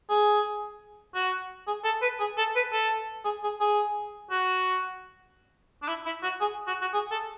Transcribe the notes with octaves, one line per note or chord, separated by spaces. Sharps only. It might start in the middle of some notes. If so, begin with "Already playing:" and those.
G#4
F#4
G#4
A4
B4
G#4
A4
B4
A4
G#4
G#4
G#4
F#4
D4
E4
E4
F#4
G#4
F#4
F#4
G#4
A4